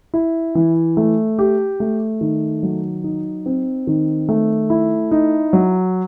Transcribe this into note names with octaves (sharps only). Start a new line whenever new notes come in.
E4
E3
A3
G4
A3
D#3
F#3
D#4
C4
D#3
A3
E4
D#4
F#3